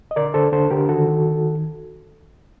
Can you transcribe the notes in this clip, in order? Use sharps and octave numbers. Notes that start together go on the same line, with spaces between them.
D#5
D3 A#4 D5
D3 A4 C5
D3 A4 C5
D3 G4 A#4
D#3 F#4 A4
D#3
D#3